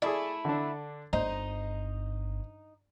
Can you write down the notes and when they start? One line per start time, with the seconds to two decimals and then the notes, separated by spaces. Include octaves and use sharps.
0.02 A3 E4 G#4 A4 D5
0.45 D3 D4
1.13 G1 D#4 C5 D#5 A#5